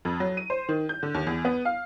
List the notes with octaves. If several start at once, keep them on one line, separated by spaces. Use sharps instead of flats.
F2
F#3
D#7
C5
D#3
G6
D3
D#2
E2
B3
F5